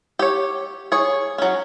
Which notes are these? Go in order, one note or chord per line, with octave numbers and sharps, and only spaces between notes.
G4 C#5
G#4 C#5
F#3 C#4